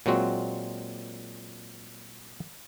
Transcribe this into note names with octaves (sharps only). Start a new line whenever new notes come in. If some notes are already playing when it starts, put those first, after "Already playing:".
A#2 F#3 G#3 C4 F#4